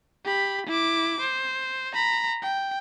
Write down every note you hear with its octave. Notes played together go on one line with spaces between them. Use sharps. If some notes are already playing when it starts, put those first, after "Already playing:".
G4 B5
E4 D6
C5
A#5 B5
G5